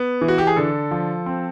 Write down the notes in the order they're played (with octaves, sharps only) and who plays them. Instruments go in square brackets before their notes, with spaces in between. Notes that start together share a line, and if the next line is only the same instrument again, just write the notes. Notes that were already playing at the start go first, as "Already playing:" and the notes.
Already playing: [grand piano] B3
E3
F#4
G4
G#4
D3 A4
F3
C4